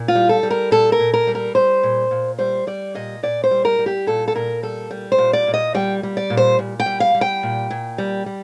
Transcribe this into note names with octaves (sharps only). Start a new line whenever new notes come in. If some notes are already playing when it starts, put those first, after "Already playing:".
Already playing: A#2
F4
G3
A4
G3
A#4
A#2 A4
A#4
A#2
A#4
G3
A#4
G3 C5
A#2
A#2
G3 C5
G3 D5
A#2 D#5
A#2 D5
C5
G3
A#4
G3
G4
A#2 A4
A4
A#2 A#4
G3 A4
G3
C5
A#2
D5
A#2
D#5
G3 G5
G3
D5
A#2
C5
A#2
G5
G3
F5
G3
G5
A#2
A#2
G3
G3